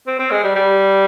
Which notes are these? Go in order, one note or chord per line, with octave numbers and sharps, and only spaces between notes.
C4
C4
G#3
G3
G3